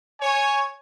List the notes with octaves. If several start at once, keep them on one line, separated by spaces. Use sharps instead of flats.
C#5 G#5